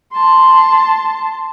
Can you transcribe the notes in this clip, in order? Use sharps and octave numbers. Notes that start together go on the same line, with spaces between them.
A5 C6